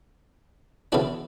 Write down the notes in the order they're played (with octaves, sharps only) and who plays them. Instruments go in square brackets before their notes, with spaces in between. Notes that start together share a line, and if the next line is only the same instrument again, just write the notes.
[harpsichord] C#3 E3 B3 D4 F#4